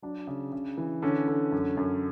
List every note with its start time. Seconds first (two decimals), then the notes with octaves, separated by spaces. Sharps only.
0.02 F#3 D4
0.27 C#3
0.52 C#3
0.77 E3
1.02 D3 C#4
1.28 D3
1.52 F#2
1.77 F#2